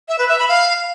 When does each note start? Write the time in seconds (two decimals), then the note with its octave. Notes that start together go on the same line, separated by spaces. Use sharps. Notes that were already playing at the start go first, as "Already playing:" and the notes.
0.09 E5
0.19 B4
0.29 E5
0.39 B5
0.49 F5